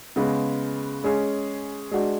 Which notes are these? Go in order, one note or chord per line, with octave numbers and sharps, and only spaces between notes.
C#3 G#3 B3
G#3 C#4 G#4
G#3 D4 F#4